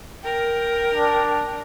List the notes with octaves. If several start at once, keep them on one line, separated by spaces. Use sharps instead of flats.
A#4 G5
D4